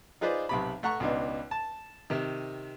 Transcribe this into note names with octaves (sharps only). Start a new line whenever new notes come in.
D#4 F4 G#4 B4 C5 D5
B1 C3 B5
A3 F#5 A#5 C#6
C#2 B2 D4 D#4
A5
C3 D#3